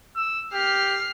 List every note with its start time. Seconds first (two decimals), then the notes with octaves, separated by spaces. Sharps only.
0.16 E6
0.53 G4 F6 C7